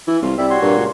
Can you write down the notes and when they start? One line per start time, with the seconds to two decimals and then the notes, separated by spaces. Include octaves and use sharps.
0.07 E3 E4
0.22 C2 F4
0.38 C2 G3 E4 E5
0.50 F#4 C#5 C6
0.62 G2 A#2
0.77 C#2